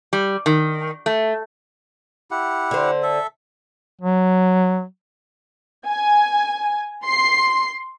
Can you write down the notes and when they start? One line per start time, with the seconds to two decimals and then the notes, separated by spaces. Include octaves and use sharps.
0.13 G3
0.46 D#3
1.06 A3
2.31 E4 G4 F#5
2.71 D3 C5
3.03 A4 E5
4.01 F#3
5.88 G#5
7.05 C6 C7